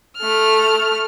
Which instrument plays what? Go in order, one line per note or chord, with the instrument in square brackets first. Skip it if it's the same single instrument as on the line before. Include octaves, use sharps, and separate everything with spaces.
[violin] A3 F6